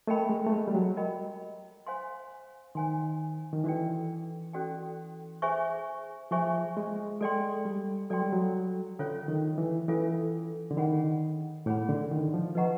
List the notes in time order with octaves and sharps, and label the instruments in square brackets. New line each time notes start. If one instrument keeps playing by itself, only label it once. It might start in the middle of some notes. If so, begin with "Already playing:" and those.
[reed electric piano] A3 [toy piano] A#4 D#5 G5 B5
[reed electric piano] G#3
A3
G#3
G3
F#3
[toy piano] A#4 D#5 G5 B5
C5 F5 G#5 C6
[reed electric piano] D#3 [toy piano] C5 F5 G#5 C6
[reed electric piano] D#3
[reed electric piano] E3 [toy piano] C#4 F#4 A4 D5 G5
[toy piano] C#4 F#4 A4 D5 G5
G#4 C5 E5 G#5 C#6
[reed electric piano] F3 [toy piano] G#4 C5 E5 G#5 C#6
[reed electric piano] G#3
[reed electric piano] G#3 [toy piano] A4 D5 G5 C6
[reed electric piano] G3
[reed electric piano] F#3 [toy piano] A4 D5 G5 C6
[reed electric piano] G3
F#3
[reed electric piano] D3 [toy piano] C#4 F4 A4 C#5 F5
[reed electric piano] D#3
E3
[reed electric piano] E3 [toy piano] C#4 F4 A4 C#5 F5
[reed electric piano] D3
[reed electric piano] D#3 [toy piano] G#4 C#5 F#5 B5
[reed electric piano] A2 [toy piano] G#4 C#5 F#5 B5
[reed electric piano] D3
D#3
F3
[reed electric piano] F3 [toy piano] B4 D#5 F#5 A#5 C#6